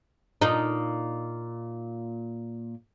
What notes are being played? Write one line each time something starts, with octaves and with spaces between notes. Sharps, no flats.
A#2 D#4